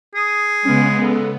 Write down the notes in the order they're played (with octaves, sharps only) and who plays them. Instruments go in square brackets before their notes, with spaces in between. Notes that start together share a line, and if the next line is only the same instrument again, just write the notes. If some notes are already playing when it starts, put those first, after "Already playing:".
[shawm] G#4 [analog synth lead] D#6
[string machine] C#3 B3 [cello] G#3 [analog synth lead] C#4
[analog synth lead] A4